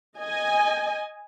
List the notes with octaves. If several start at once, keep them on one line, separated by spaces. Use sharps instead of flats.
D#5 G#5